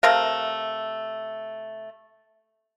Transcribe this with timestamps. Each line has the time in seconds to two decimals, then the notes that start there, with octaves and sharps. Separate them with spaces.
0.03 C3 A3 A#4 F5